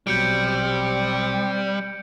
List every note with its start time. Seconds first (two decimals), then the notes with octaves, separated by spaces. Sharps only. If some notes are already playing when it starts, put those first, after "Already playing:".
0.07 A#1 B2 F#3 G3 C4 G6 C#7 D7